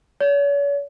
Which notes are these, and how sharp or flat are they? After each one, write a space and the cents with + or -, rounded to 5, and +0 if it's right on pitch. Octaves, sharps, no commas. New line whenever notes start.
C#5 +40